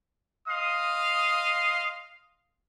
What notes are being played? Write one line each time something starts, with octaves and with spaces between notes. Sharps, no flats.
D#5 F5 C6 D#6